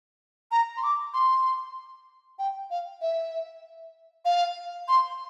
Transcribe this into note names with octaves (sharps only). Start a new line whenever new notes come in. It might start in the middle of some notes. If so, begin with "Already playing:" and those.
A#5
C6
D6
C6
G5
F5
E5
F5
C6